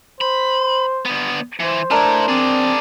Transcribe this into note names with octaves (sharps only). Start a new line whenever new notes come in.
C5 B5
D3 B3
E3 C5
A3 D4 E4 A#4 C6
C4 G#4 D5